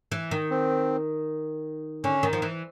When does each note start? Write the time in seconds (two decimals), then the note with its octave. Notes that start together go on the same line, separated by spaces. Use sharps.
0.12 E3
0.31 D#3
0.50 C4
2.04 D3 C#4
2.23 D#3
2.33 F3
2.42 E3